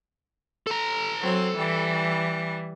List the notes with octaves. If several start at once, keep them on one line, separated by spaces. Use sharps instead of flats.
A4 A#5
F#3 C4
E3 G3